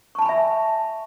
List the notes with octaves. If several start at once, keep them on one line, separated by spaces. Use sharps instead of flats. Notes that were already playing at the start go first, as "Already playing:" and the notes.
E5 G#5 A5 B5 C#6